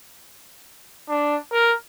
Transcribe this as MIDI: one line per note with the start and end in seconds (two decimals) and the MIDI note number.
1.09 1.37 62
1.52 1.73 70